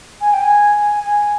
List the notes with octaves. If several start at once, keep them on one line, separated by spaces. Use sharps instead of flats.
G#5
G5
G#5
G#5